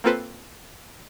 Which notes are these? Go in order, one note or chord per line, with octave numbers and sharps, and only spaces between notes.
A#3 C4 F4 A4 B4 C5